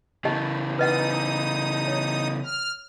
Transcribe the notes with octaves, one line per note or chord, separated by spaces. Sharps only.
C#3 E3 G4 D#5 A5
D#4 B4 D#5 F#5 D#6
C#5
F6